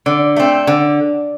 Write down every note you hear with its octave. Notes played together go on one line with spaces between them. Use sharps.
D3 D5
A3 C4
D3 D5